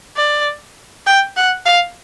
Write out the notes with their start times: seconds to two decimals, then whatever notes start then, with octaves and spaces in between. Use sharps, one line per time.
0.16 D5
1.06 G5
1.36 F#5
1.66 F5